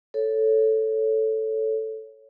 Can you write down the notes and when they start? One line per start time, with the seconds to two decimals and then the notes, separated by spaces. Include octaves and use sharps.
0.14 A4 C#5